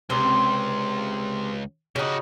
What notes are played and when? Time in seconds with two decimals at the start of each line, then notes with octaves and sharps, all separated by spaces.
0.10 C#2 C3 C4
1.96 C#3 D#4 F#4 G4